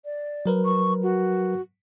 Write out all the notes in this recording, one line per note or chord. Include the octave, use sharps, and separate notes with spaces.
D5
F#3 A#4 B4
C#6
F#4